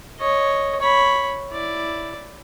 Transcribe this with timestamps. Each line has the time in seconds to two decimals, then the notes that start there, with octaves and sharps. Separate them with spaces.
0.19 C#5 D#5
0.80 C#5 B5
1.51 E4 D5